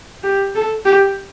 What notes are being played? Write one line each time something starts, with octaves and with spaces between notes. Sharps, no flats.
G4
A4
G4